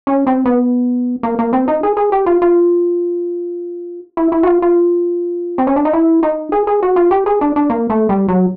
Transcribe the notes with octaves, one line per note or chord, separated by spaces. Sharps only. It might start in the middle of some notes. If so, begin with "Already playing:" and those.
C#4
C4
B3
A#3
A#3
C4
D#4
G#4
G#4
G4
F4
F4
E4
E4
F#4
F4
F4
C4
C#4
D4
D#4
E4
D#4
G#4
G#4
F#4
F4
G4
G#4
D4
D4
A#3
A3
G3
F#3